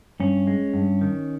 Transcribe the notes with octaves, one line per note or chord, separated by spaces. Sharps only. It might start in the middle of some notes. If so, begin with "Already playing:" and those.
G2 C#4
G#3
G2
D#3